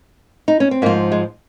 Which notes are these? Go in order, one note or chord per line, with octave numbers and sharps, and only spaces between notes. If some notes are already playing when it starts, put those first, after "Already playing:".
D#4
C#4
C4
G#2 F3 A#3
G#3